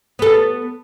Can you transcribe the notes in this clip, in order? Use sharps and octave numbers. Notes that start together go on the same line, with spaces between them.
B3 A4